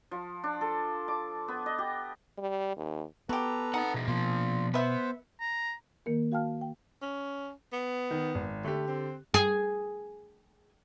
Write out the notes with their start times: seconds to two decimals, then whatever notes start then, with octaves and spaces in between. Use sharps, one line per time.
0.11 F3
0.44 D4
0.61 A4
1.08 D6
1.48 B3
1.66 D#5
1.78 G4
2.38 G3
2.77 D#2
3.29 B3 F#4 G4 A4 B4 A#5
3.74 C4 D#4 F#5
3.94 B2 G#4
4.08 B2 F3 A#3 F4
4.74 B3 B4 C5 E5
5.40 A#5
6.06 D#3 A#3 A#4
6.32 F#4 F5 G5 A5 F6
6.61 G5
7.02 C#4
7.73 B3
8.11 D#3
8.35 G#1
8.64 D3 A3 G4
8.87 C4
9.34 G#4